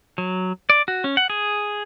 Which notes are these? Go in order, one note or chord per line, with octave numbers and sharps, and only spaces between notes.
F#3
D5
F#4
C#4
F#5
G#4